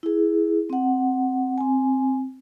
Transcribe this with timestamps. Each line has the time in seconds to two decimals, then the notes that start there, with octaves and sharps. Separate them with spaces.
0.03 E4 G#4
0.70 C4 F#5
1.58 C4 G#5